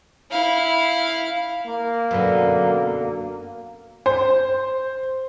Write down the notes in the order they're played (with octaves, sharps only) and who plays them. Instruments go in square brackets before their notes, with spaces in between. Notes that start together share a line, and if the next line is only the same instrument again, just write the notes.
[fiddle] E4 F5
[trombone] A#3
[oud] F#2 B2 D3
[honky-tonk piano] C5